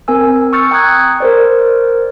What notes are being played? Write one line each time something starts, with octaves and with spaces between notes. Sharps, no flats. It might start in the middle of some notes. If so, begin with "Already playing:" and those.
C4 A#4 G#5 E6
C#6 E6 F6 G6 A6 C#7
G5 A#5 D#6 F#6 G#6
A#4 C5 D5